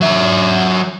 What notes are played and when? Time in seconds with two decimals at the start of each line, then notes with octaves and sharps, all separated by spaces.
0.01 F#3 E5